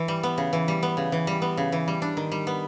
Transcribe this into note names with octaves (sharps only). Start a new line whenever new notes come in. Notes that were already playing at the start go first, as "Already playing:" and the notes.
Already playing: E3
G3
B3
C#3
E3
G3
B3
C#3
E3
G3
B3
C#3
E3
G3
D4
D#3
G3
B3